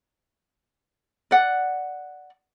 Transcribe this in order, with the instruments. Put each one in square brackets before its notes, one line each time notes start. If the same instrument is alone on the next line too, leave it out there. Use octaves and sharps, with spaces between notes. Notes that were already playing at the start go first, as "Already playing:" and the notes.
[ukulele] D5 F#5